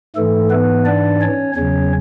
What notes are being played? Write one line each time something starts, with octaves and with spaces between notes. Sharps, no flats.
G#2 E3 A3 A4
B3 B4
D4 D5
C#4 C#5
E2 C#3 F#3 C#4 C#5